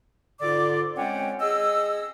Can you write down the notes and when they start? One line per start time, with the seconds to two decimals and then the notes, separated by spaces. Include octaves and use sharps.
0.41 G#2 D3 F4 A4 D5 D6
0.97 G#3 C4 C#4 C#5 F#5 G5
1.40 G#4 D#5 E6